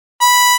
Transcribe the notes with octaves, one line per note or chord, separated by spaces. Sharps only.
B5